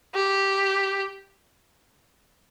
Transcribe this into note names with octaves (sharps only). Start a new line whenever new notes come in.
G4